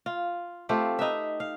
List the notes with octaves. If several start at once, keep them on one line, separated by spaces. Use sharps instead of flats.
F4
A3 C4 F4 G4
D#4 B4 E5
F5